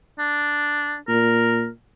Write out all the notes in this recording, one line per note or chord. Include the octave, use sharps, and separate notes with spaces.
D4
A#2 A#4